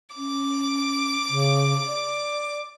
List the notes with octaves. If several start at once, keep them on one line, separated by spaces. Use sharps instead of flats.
C#4 D6
C#3
D5